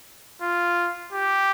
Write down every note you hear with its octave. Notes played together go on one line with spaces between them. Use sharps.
F4
G4